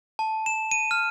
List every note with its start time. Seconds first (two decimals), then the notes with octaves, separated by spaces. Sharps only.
0.19 A5
0.46 E7
0.71 D#7
0.91 F6